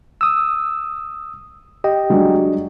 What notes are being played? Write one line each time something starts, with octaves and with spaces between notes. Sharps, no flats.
D#6 E6
G4 D#5 G5
F#3 G#3 D4